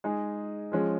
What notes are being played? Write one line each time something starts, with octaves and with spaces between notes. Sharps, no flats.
G#3 D#4 G#4
F3 G#3 C#4